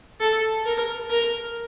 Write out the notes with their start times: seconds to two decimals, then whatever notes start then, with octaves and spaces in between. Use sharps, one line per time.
0.20 A4
0.66 A#4
1.10 A#4